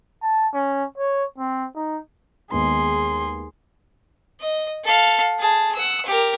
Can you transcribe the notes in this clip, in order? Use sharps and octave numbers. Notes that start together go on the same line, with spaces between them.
A5
C#4
C#5
C4
D#4
D#2 G#3 B3 G#4 C6
D#5
A4 F5
G#4 A5
F#5 E6
G4 A#4